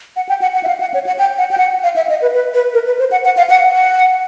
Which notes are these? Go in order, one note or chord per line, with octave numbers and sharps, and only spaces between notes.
F#5
G5
F#5
F#5
E5
F5
F#5
C#5
F#5
G5
F#5
G5
F#5
F5
E5
D#5
B4
B4
B4
A#4
B4
C5
F#5
F#5
F5
F#5
F#5